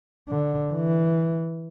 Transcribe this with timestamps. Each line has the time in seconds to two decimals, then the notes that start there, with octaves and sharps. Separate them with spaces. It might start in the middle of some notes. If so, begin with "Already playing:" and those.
0.28 D3
0.72 E3